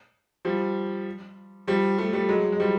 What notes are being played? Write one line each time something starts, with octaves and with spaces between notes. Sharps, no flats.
F3 G3
F3 G3
G3 A3
G3 A3
F#3 G#3
G#3
F3 G3